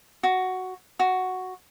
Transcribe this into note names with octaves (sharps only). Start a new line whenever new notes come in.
F#4
F#4